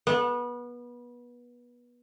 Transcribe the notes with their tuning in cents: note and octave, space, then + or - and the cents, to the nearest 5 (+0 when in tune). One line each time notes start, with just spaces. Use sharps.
B3 -25